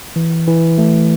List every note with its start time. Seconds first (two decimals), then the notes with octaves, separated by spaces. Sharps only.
0.16 E3
0.48 E3
0.78 A3